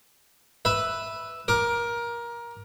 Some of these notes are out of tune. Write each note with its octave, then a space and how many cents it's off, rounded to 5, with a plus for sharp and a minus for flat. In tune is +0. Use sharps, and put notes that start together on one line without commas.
B4 +0 E5 +0
A#4 +20 D6 +0